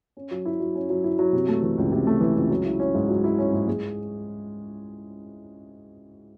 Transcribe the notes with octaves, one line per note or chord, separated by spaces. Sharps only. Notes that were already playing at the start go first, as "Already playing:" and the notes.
C#4
F#3
E4
F#3
C#4
F#3
E4
F#3
C3
A3
E3
C#2
C3
A3
E3
C#2
F#3
E4
C#4
G#2
F#3
E4
C#4
G#2
G#3